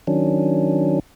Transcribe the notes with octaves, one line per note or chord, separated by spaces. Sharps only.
D#3 F#3 C#4 D4